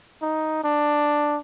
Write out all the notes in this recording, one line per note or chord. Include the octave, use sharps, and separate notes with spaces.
D#4
D4